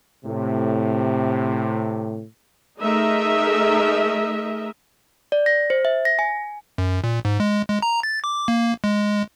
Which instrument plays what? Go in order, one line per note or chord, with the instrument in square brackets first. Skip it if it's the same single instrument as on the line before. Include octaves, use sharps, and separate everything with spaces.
[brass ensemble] A2 C3
[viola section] A3 D#4 G#4 A#4 D#5 E5
[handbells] D5
A#6
C5
E5
A#6
G#5
[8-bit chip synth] F#2
A#2
G#2
G#3
G#3
A#5
A6
D6
A#3
G#3